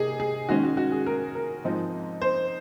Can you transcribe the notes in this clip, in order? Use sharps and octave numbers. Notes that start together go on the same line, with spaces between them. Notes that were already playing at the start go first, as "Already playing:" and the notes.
Already playing: C3 A#3 D#4 G#4
G#4
D#3 G#3 C#4 F#4
F#4
F#4
G#4
A#4
A#4
G#2 F3 G#3 C4 D#4
C5